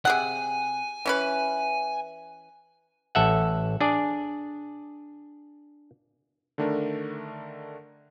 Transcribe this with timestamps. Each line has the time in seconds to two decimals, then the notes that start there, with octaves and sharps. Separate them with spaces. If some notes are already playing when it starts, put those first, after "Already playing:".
0.05 C3 G#4 F#5 G#5
1.06 E3 C#4 B4
3.15 A1 A4 E5 F#5
3.81 D4 G#4 D5
6.58 D3 D#3 A3 D4 A#4